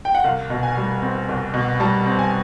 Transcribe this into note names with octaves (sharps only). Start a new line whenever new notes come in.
G5
F#5
C2 F5
B2
G#5
G3
C4
C2
B2
G3 A5
C4
G#5